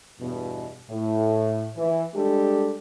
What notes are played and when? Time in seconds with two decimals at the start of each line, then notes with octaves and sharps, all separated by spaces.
0.20 E2 G2 B2
0.90 A2
1.77 E3
2.15 G3 G#3 D4 G4 A4